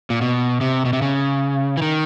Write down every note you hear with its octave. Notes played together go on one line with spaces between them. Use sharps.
A#2
B2
C3
B2
C3
C#3
E3
D#3